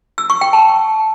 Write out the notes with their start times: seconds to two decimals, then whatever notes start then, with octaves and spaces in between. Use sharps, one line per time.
0.18 E6
0.30 C#6
0.41 G5
0.53 A5